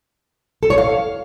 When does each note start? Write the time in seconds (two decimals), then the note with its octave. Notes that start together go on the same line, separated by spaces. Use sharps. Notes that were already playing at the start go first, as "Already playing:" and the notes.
0.63 A4
0.70 C#5
0.78 F5